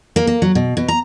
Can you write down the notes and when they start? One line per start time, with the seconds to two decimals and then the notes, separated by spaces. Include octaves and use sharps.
0.16 A#3
0.27 A#3
0.42 F#3
0.55 B2
0.77 B2
0.88 A#5